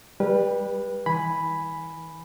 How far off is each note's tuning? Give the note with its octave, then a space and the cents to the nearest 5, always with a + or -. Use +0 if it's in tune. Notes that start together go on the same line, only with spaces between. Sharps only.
G3 +20 B4 -20
E3 -40 G#5 +0 B5 +0